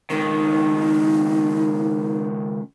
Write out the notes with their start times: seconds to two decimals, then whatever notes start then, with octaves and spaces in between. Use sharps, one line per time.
0.10 C#2 D#3 D#4